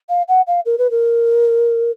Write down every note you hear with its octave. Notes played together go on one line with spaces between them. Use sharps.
F5
F#5
F5
A#4
B4
A#4